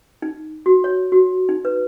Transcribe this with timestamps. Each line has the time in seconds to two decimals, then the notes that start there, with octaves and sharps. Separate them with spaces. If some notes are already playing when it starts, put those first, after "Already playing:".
0.22 D#4
0.66 F#4
0.84 C#5
1.12 F#4
1.49 D#4
1.65 B4